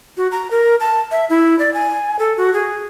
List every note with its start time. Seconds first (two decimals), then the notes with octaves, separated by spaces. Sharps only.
0.17 F#4
0.32 A#5
0.51 A#4
0.80 A5
1.11 E5
1.30 E4
1.59 D5
1.74 G#5
2.19 A4
2.37 F#4
2.54 G#4